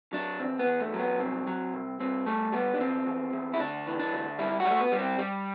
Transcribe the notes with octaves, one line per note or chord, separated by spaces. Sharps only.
F#3 D4
E2 C4
B3
E2
A3
F#3
B3
C2 C4
F#3
C2
G2 C4
G3 A3
G3 B3
D4
E2 C4
E2
E2
E4
D2 D4
E3
D4
D2
G3 E4
F#4
G3
A3
B3
G3
C4
G3